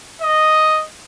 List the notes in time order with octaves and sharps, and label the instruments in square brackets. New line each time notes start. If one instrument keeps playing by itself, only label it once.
[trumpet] D#5